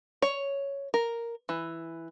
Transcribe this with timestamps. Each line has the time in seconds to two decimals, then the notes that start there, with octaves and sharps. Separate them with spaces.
0.22 C#5
0.94 A#4
1.49 E3